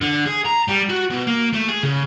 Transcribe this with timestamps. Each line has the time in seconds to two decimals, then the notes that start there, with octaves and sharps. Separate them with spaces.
0.02 D3
0.26 G#4
0.45 A#5
0.68 G3
0.89 F#4
1.10 B2
1.27 A#3
1.53 A3
1.68 G#4
1.83 C#3